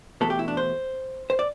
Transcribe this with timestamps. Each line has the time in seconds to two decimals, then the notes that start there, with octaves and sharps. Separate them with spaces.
0.21 E2 B2 A3 A4
0.30 G4
0.39 E4
0.48 D4
0.57 C5
1.30 C5
1.39 D5